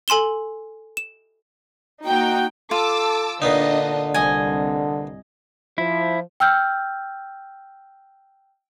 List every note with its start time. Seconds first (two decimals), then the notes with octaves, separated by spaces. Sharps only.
0.08 A4 G#5 C6 E7 G7
0.97 E7
2.04 A#3 D#4 F#4 G5
2.71 F4 A4 A5 D6 E6
3.42 A#2 D3 B3 D4 D#4 D#5
4.14 C2 D#5 G#5
5.78 F3 E4
6.40 G5 E6 F6 G6